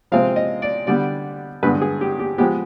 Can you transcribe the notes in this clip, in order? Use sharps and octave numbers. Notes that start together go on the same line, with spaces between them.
C3 F3 G#3 C4 F5
D#5
D5
D3 G3 B3 D5
G2 D3 G#3 B3 B4
G#4
G4
G4
F3 G#3 B3 G4